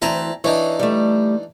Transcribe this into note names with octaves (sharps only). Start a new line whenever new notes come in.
D2 E3 C4 E4 A5 A#5
E3 D4 D#4 C#5
G3 A3